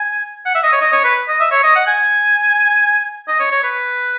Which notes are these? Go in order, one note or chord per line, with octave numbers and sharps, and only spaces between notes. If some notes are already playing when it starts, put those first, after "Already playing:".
Already playing: G#5
F#5
E5
D#5
C#5
D#5
C#5
B4
D#5
E5
C#5
D#5
F#5
G#5
D#5
C#5
C#5
B4